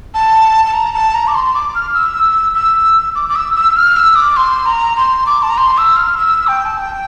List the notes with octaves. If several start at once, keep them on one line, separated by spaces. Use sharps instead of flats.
A5
A5
A#5
A5
A#5
D6
C6
D6
F6
E6
E6
D6
D6
E6
E6
F6
E6
D6
C6
A#5
C6
D6
A5
A#5
C6
E6
F6
E6
G5
A5
G5